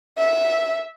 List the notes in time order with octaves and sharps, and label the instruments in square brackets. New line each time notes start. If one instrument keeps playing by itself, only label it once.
[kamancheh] E5